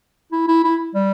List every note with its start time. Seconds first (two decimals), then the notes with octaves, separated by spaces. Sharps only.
0.32 E4
0.48 E4
0.64 E4
0.95 G3